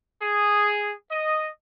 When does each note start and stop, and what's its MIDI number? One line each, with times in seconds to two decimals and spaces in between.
0.22 0.90 68
1.11 1.48 75